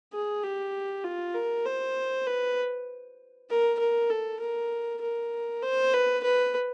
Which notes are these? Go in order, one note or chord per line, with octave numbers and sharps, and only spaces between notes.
G#4
G4
F4
A#4
C5
B4
A#4
A#4
A4
A#4
A#4
C5
B4
B4